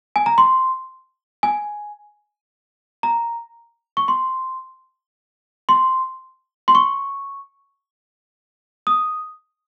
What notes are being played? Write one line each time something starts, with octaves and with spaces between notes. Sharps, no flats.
G#5
A#5
C6
G#5
A#5
C#6
C6
C6
C6
C#6
D#6